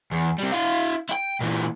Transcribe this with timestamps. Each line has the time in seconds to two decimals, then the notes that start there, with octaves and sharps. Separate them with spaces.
0.12 E2
0.39 C3 G3
0.52 E4 F5
1.09 E4 G5
1.40 A#2 E3